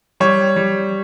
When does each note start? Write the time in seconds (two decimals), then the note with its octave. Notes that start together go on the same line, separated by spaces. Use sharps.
0.20 G3 C#5
0.56 G3